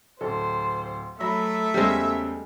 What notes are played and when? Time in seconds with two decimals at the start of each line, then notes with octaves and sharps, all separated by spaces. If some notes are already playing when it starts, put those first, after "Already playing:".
0.21 D1 A4 C5
1.21 F#3 A3 E5 B5 A#6
1.74 E2 C#3 G3 G#3 C5